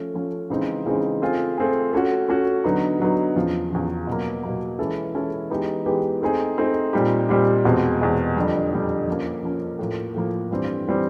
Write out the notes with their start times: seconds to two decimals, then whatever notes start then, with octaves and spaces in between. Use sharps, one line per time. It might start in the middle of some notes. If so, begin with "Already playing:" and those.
Already playing: F3 A3 C#4
0.14 F3 A3 C#4
0.50 C#3 E3 G#3 C4 D#4
0.86 C#3 E3 G#3 C4 D#4
1.21 A3 C4 F4 G#4
1.58 A3 C4 F4 G#4
1.93 A3 C#4 F#4
2.28 A3 C#4 F#4
2.64 D3 F#3 B3 D#4
3.00 D3 F#3 B3 D#4
3.36 E2 C#3 F3
3.71 E2 C#3 F3
4.07 B2 F#3 A#3
4.43 B2 F#3 A#3
4.79 E3 G#3 C#4 E4 A4
5.14 E3 G#3 C#4 E4 A4
5.50 E3 G#3 B3 D#4 G4
5.86 E3 G#3 B3 D#4 G4
6.22 A3 C4 D#4 G#4
6.58 A3 C4 D#4 G#4
6.93 A#2 G3 C4 D#4 G4
7.29 A#2 G3 C4 D#4 G4
7.65 E2 B2 G#3 C4
8.00 E2 B2 G#3 C4
8.36 F2 D3 G3
8.72 F2 D3 G3
9.08 F3 A#3 C#4
9.43 F3 A#3 C#4
9.79 A2 F3 A#3
10.14 A2 F3 A#3
10.51 G2 E3 G3 C4
10.88 E3 G3 C4